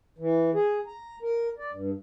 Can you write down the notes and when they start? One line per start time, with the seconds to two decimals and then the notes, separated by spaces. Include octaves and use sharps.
0.18 E3
0.54 G#4
0.87 A#5
1.22 A#4
1.58 D5
1.71 G2